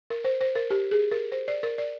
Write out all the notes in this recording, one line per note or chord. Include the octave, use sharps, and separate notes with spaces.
A#4
C5
C5
A#4
G4
G#4
A#4
C5
D5
A#4
D5